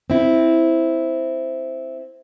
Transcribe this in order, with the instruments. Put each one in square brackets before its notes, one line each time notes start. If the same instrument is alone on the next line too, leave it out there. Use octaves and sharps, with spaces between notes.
[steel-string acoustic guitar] C4 E4